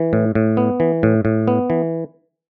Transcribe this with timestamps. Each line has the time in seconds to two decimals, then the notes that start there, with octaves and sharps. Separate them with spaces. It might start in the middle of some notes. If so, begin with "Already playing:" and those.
Already playing: E3
0.13 A2
0.35 A2
0.57 B3
0.80 E3
1.03 A2
1.25 A2
1.48 B3
1.70 E3